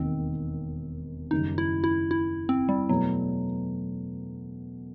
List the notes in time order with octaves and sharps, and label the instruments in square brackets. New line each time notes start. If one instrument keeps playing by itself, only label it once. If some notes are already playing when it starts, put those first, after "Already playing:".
Already playing: [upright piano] E1 D#2 D#3 [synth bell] C4
[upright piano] F#1 F#2 D#3 G3 [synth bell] D#4
[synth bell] E4
E4
E4
C4
G3
[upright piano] E2 B2 A3 [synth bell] F#3